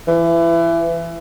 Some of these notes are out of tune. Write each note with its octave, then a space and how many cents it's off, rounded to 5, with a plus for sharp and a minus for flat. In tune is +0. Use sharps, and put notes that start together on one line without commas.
E3 +25